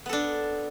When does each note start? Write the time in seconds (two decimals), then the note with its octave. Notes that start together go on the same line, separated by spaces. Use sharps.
0.06 B3
0.09 A4
0.13 D4